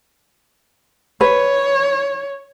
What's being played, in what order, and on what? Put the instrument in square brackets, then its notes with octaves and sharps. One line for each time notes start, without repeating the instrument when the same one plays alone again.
[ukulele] B4 [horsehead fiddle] C#5